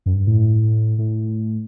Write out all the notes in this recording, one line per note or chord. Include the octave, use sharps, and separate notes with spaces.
F#2
G2
A2
A2